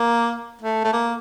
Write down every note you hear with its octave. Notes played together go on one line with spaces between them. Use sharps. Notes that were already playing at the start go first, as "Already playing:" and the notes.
Already playing: A#3
A3
A3
A#3